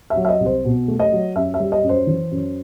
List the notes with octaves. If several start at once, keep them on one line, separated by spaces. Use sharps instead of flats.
E5
F#3
E5
D#5
C2
C5
B2
A3
D#5
F#3
F#2 E5
E5
G3
D#5
F#2
C5
E3
F#2